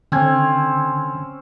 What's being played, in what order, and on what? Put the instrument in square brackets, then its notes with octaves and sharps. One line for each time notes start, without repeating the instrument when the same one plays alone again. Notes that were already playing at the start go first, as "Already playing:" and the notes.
[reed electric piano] D3 G#6 [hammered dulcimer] C4 C#4